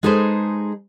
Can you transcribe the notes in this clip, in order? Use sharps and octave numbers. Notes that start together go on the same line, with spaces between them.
G#3 D#4 G#4 A4 B4 C5